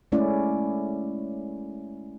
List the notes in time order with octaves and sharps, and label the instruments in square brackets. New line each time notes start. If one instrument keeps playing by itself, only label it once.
[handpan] G#3 A3 C#4 E4 D5